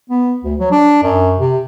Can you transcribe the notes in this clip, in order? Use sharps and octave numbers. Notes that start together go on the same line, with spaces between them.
B3
D2
F#3
D4
F#2
C3